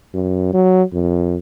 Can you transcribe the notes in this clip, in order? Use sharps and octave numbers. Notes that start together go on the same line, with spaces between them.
F#2
F#3
F2